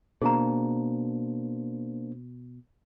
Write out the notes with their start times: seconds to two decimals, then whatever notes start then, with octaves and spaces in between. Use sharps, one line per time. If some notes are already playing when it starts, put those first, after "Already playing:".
0.22 B2 A#3 D4 G#4 C5 A#5